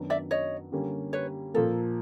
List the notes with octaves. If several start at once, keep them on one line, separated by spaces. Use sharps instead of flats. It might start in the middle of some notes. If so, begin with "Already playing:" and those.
Already playing: F#2 D#3 F#3 B3 D4
D5 E5
C#5 D#5
D3 G3 A#3 C#4
B4 C#5
A#2 F3 A#3 A4